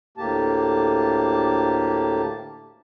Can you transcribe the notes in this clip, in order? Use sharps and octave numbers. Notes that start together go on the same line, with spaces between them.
D2 A2 A#3 G4 A5